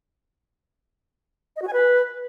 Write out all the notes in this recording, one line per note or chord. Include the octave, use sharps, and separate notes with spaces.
D#5
F#4
G#5
B4